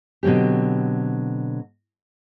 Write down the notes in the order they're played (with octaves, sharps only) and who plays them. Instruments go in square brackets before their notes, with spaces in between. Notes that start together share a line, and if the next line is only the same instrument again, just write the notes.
[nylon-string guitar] B2 D3 F#3 C4 G4